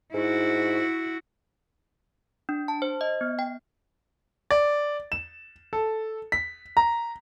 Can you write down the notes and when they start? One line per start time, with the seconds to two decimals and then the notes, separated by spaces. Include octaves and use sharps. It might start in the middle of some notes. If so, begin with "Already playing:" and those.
0.14 G#2 E4 F#4
2.49 D4
2.68 A5
2.82 C5
3.01 D#5
3.21 B3
3.39 G5
4.51 D5
5.12 E7
5.73 A4
6.32 B6
6.77 A#5